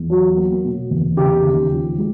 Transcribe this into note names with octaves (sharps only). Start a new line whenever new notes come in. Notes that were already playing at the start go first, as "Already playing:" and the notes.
Already playing: E2
F#3
A#3
B2
E2
C#3 G4
D#2
F3
G#3